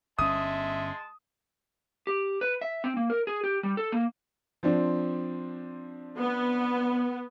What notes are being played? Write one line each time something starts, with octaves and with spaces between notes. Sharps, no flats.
G1 G#3 C#4 E5 A5 C6 D#6
G4
B4
E5
C4
A#3
A#4
G#4
G4
G3
A4
A#3
F3 C4 D4
B3